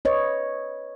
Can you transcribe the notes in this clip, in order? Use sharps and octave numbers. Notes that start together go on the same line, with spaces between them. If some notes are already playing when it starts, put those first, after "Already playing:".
B4 C#5 D#5